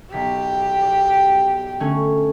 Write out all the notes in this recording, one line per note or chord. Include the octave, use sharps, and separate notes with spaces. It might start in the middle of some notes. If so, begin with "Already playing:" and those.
B1 G4 B6
D5
D3 A3 C#4